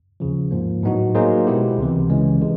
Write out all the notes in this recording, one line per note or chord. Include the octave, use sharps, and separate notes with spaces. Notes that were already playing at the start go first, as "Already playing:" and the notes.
D#2 C#3 F3
G#2 F3 A#3
A2 F#3 B3 D#4 F#4
F#3 A#3 D#4 G#4 C5
B2 G#3 B3 E4 G4
C#2 C3 E3
C#2 C#3 E3 G#3 C#4
C3 E3 G#3